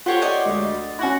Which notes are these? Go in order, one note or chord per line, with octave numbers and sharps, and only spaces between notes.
F4 G4 A4 C5 C#5 F#5
D5 D#5 F#5
D2 G#3
C#4 E4 F#4